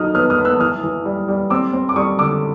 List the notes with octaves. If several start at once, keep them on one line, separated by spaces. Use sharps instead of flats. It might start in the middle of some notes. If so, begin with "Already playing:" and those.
Already playing: F#3 D#4 D#6 F6
B3 D#6 F6
D#6 F6
B3
E6 F#6
E3 D#6 F6
E3
G3
G3
C4 D6 E6
C4
D6
G3 C#6 D#6
D3 D6 E6